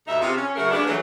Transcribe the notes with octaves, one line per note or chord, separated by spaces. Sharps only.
D2 G2 D#4 E5
C3 F4 G#4
C#4
C#3 F#3 A3 F#4 G#4 A#4
G#3 A#3 B3 D4
E3 F#3 A3